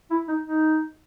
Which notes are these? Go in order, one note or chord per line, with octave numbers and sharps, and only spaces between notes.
E4
D#4
D#4